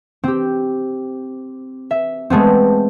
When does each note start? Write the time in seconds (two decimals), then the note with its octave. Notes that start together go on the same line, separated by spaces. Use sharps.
0.24 C4 G4
1.91 E5
2.30 G#3 A3 B3 C4